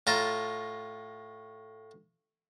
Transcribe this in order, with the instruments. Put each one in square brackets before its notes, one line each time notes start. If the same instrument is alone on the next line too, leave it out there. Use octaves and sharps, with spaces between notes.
[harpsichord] A2 F4 A5 A#5